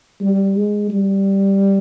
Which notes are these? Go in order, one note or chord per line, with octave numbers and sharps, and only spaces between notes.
G3
G#3
G3